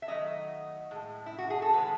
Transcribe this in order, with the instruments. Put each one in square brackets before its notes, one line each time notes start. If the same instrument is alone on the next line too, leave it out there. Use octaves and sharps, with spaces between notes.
[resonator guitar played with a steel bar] E5
D#3 F#3 A3 D#5
A2 G#3
E4
F#4
G#4
A4
D#3 G#3 B4